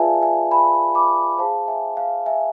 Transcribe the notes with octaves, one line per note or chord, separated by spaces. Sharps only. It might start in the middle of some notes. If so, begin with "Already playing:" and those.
Already playing: F4 G#4 B4 D5 E5 F5 G#5 A5
E5 G#5
G#5 B5
B5 D6
G#4 C5 F5 A5
E5 G#5
F5
E5 G#5